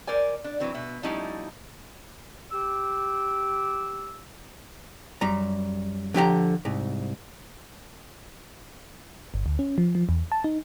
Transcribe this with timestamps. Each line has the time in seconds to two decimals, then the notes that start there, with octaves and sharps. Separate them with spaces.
0.07 A#4 C5 D5 G#5
0.44 D4
0.60 E3 F#3 C4
0.74 B2 E5
1.03 F3 G3 A3 C#4 D#4 E4
2.51 G4 D6 E6
5.21 F#2 G3 A#5
6.14 D3 F3 G4 A#5
6.65 C2 G#2
9.34 G1
9.46 D2
9.59 C#4
9.78 F3
9.95 F3
10.09 E2
10.32 A5
10.44 D#4